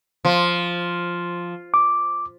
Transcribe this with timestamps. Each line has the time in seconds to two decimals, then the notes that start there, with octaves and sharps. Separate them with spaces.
0.25 F3
1.74 D6